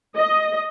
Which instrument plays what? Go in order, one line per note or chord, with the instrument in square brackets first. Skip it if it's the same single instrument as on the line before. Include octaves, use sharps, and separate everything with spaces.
[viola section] D#5